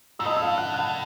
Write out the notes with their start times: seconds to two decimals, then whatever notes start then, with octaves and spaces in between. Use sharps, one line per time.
0.19 G#2 E6
0.26 A2 D#5 D#6
0.36 E6
0.41 F5 F6
0.58 F#5 F#6
0.74 F#5 F#6